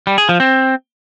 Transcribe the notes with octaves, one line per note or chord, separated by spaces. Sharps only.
G3
G#4
F3
C4